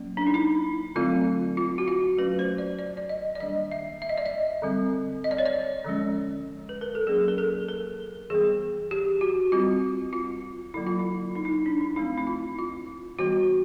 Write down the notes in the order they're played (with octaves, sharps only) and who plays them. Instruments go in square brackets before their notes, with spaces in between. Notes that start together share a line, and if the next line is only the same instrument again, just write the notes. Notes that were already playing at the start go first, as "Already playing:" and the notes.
Already playing: [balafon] F#3 A#3 C#4
D4
D#4
E4
D3 F#3 A3 C4 F4
F4
F#4
F4
F#3 A3 C#4 B4
C5
D5
D5
D5
D#5
D5
D#3 G3 A#3 D4 D#5
E5
E5
D#5
D5
D#5
D3 G3 C4
D#5
D5
C#5
D5
D3 F3 G#3 C#4
B4
A#4
A4
F#3 A#3 C#4 G#4
A#4
A4
A#4
E3 G3 B3 G#4
G4
F#4
G3 C4 F4
F4
D3 F#3 A#3 E4
F4
E4
D#4
E4
D#4
D4
D#4
F3 A3 C4 E4
E4
F4
F4
E3 G3 B3 F#4